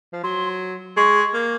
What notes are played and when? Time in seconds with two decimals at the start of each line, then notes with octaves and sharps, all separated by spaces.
0.12 F3
0.23 F#3 C6
0.96 G#3 C#6
1.33 A#3